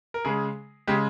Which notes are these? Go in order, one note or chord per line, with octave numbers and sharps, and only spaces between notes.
A#4
C#3 G#3 G#4
C#3 G#3 G4